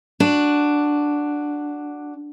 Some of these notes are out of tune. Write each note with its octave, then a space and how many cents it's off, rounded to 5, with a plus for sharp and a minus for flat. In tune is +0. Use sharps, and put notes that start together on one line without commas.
D4 +0 F#4 +0